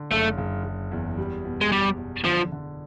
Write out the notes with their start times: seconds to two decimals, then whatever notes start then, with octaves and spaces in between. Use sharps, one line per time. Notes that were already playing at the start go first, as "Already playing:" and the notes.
Already playing: D3
0.11 F#1 A3
0.38 F#1
0.64 F#1
0.92 E2
1.17 G3
1.45 B2
1.61 G#3
1.72 B2 G3
1.98 B2
2.24 D3 F3
2.52 D3